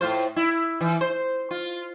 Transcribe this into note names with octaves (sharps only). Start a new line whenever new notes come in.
A2 F4 C5
E4
E3
C5
F4